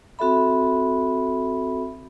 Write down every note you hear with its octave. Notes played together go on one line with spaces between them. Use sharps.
C4 F#4 A4 E5 B5